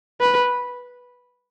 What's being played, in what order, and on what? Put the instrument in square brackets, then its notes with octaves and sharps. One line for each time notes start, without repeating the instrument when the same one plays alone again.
[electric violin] B4